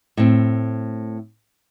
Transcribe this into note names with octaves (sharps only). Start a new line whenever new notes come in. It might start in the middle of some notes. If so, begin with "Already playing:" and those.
A2 C4